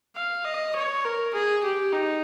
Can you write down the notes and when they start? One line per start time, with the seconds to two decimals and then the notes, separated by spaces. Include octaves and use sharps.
0.16 F5
0.45 D#5
0.76 C#5
1.05 A#4
1.34 G#4
1.64 G4
1.93 D#4